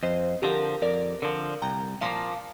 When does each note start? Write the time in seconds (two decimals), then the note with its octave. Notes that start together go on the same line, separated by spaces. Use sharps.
0.03 F2 C5 D#5
0.42 D3 F3 G4 A#4
0.82 F2 A#4 D5
1.22 D3 F3 A#4 D5
1.62 C2 G5 A#5
2.01 A#2 F3 A#3 F5 A5